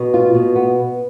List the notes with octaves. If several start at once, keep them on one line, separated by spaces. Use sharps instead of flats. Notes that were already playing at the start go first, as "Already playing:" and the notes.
Already playing: B2
F4
B2
B3